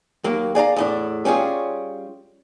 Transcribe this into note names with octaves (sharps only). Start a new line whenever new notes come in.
D#2 F#3 A#3
G#4 D5 F5 A#5
E2 A2 D4
G3 C#4 F4 G#4